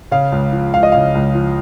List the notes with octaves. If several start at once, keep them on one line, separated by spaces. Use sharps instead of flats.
C#3 F5
C#2
F3
C#2 F5
D#5
C#3 F5
C#2
F3